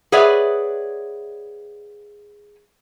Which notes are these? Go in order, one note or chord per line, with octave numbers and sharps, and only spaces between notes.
G#4 B4 C#5 D5 E5 F#5